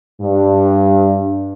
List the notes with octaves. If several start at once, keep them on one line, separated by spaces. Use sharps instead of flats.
G2